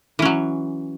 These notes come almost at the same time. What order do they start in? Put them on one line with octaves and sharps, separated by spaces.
E3 C#4 F#3